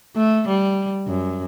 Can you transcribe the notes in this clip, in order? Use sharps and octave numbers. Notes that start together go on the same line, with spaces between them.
A3
G3
F#2